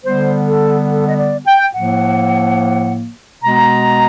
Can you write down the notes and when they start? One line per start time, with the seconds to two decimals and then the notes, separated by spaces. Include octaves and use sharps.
0.05 D3 G3 B3 C5
0.48 A4
0.90 A4
1.08 D#5
1.18 D5
1.46 G5
1.74 A2 F3 A#3 F#5
3.43 B2 G#3 B3 A#5